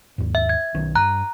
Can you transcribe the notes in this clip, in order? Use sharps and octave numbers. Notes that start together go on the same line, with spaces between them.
D#2 G#2
E5
G#6
B1 D#3 C#4
G2 A#5 F#6